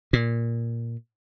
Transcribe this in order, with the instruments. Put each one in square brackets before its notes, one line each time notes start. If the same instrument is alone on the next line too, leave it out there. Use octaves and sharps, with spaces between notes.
[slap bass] A#2